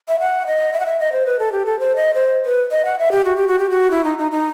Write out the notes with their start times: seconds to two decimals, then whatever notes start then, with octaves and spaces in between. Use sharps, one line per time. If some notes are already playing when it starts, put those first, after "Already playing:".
0.08 E5
0.20 F#5
0.47 D#5
0.73 E5
0.80 F#5
0.86 E5
1.00 D#5
1.12 C5
1.26 B4
1.39 A4
1.52 G4
1.66 A4
1.79 C5
1.96 D#5
2.14 C5
2.45 B4
2.71 D#5
2.85 F#5
2.99 E5
3.12 G4
3.25 F#4
3.37 G4
3.48 F#4
3.59 G4
3.70 F#4
3.91 E4
4.04 D#4
4.18 D#4
4.32 D#4